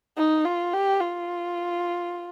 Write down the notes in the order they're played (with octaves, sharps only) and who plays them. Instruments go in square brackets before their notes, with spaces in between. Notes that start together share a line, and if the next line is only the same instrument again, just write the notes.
[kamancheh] D#4
F4
G4
F4